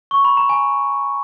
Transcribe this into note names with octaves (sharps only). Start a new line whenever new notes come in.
C#6
B5
A#5
G#5